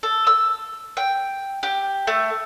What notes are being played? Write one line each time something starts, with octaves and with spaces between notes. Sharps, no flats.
A4
E6
G5
G4
A3